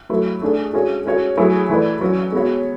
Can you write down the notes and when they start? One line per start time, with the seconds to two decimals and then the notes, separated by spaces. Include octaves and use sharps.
0.09 F#3 A3 E4
0.41 A3 D4 G#4
0.73 G#3 C#4 F#4 C#5
1.05 G#3 C#4 F#4 C#5
1.37 F#3 A3 E4 G#4
1.69 E3 A3 E4 B4 D5
2.01 F#3 C#4 F#4
2.32 G#3 B3 F#4 C#5